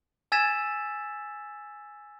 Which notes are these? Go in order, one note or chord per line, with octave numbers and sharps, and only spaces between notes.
G#5 E6 G#6 A6 B6 E7